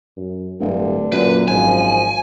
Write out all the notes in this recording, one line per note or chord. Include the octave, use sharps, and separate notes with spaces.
F#2
D1 G2 D3
F#2 A#2 B4
G#1 F3 G#5